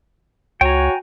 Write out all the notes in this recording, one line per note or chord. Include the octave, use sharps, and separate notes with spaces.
C#2 F#4 C#5 G5 G#5 A#5